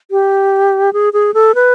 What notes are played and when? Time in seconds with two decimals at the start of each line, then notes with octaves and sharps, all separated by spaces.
0.11 G4
0.93 G#4
1.13 G#4
1.34 A4
1.55 B4